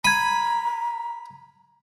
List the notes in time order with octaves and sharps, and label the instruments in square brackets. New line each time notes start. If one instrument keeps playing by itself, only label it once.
[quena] A#5 [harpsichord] B5 [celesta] G#6 D#7